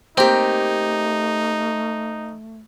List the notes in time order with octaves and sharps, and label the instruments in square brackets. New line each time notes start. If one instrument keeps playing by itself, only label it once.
[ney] A3 [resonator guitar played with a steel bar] A#3 G4 [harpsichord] C4 [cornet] D#4